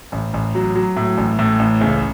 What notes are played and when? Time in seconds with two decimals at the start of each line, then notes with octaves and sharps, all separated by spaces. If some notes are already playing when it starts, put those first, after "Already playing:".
0.12 A1
0.34 A1
0.55 F#3
0.75 F#3
0.97 A2
1.18 A1
1.39 A2
1.59 A1
1.81 C#2